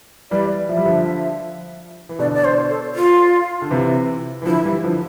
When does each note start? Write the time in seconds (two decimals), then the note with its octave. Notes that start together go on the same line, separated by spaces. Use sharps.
0.31 E3 G3 D5
0.68 F3 E5
0.77 G3
0.85 D3 F3
2.09 E3
2.19 B2 D3 D5
2.34 D5
2.45 C5
2.69 A4
2.95 F4
3.62 D3
3.71 C3 E3
4.42 E3
4.45 D3 F3 E4
4.64 E3 G3
4.84 D3 F3